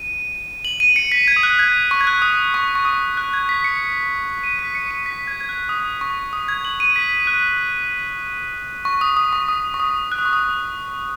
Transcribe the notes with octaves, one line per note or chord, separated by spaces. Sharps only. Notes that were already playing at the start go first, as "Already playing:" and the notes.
Already playing: D#7
F#7
D#7
C#7
B6
G#6
D#6
F#6
G#6
C#6
G#6
F#6
D#6
C#6
C#6
D#6
F#6
G#6
B6
C#7
D#7
B6
C#7
D#7
B6
G#6
G#6
F#6
D#6
C#6
D#6
G#6
F#7
D#7
B6
F#6
C#6
D#6
D#6
C#6
D#6
C#6
D#6
F#6
D#6
C#6
D#6